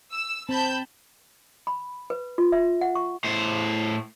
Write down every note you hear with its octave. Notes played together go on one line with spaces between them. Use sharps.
E6
C4 A5 B5 G6
B5
B4
F4
E5
F#5
C#6
A2 C5